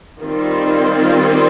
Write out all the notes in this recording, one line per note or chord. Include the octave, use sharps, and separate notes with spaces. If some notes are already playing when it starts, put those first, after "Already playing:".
D#3 G3 C4 F4